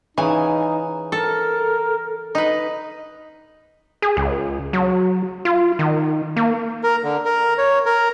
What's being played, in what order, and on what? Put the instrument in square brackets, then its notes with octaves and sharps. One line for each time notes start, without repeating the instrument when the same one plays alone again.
[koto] C#3 E3 G#5 [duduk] D#4
[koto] A4 [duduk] A#4
[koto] D#4 B4
[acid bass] G#4
C#2
F#3
F4
D#3
A#3
[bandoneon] A#4
D3
A#4
C#5
A#4